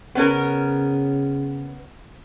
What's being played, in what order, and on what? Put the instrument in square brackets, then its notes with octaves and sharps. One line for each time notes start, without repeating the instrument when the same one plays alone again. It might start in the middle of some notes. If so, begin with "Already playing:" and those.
[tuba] C#3 [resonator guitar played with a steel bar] B3 C#4 A#4